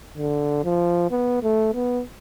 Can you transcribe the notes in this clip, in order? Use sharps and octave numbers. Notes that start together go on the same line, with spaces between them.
D3
F3
B3
A3
B3